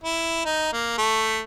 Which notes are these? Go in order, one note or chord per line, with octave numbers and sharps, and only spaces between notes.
E4
D#4
A#3
A3